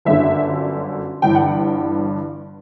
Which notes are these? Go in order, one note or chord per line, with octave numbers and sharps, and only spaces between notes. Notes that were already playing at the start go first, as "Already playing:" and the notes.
G1 F#2 D3 E5
G1 G2 E3 G5
F#5